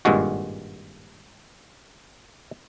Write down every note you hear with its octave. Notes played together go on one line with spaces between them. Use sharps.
G#1 G2 A#2 G#3 F#4